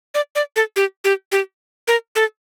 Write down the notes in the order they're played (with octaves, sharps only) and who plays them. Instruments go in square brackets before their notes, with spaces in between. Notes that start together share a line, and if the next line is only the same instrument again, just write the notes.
[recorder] D5
D5
A4
G4
G4
G4
A#4
A4